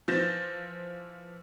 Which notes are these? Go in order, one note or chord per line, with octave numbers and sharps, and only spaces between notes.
E3 F3 G6 A6 A#6 E7